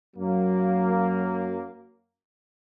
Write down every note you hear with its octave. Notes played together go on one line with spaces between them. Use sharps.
F#2 F#3 A#3